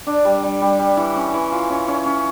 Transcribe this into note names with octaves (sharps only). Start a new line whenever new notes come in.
D4
G3
G3
G3
G3
E3
C#4
E3
F4
C#4
C#4
C#4